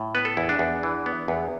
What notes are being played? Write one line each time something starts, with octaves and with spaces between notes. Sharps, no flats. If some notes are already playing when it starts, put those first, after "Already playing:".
Already playing: A2
B3 B4
A4
E2 E4
D4
E2
E3
B3
E2